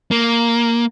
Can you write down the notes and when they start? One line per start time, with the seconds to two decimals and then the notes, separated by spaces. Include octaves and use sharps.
0.11 A#3